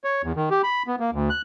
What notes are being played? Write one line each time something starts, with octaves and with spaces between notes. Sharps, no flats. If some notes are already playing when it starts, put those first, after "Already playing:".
C#5
E2
D#3
G4
B5
B3
A#3
D2
F#6